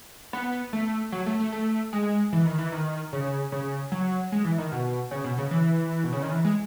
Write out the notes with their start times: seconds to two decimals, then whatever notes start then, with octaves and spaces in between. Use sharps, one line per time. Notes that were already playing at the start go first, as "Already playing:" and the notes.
0.33 B3
0.73 A3
1.12 F#3
1.26 A3
1.39 A3
1.52 A3
1.93 G#3
2.33 E3
2.45 D#3
2.59 E3
2.72 D#3
3.13 C#3
3.52 C#3
3.92 F#3
4.32 G#3
4.45 E3
4.58 D#3
4.72 B2
5.11 C#3
5.24 B2
5.38 C#3
5.51 E3
6.04 B2
6.13 C#3
6.22 D#3
6.31 E3
6.45 G#3